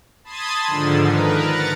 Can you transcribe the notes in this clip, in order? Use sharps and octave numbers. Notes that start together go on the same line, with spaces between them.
A5 B5 C6 D#6 G#6 A6
G#2 D3 D#3 F3
A#4 B4
F#5 A#5 A6